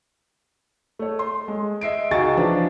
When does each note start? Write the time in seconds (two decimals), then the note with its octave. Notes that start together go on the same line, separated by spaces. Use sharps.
0.99 A3 C#5
1.19 C6
1.48 G#3
1.81 D#5 E5 C7 D7
2.11 C#2 D#4 F#4 G#4 C#6 A6
2.36 E3 F3 D4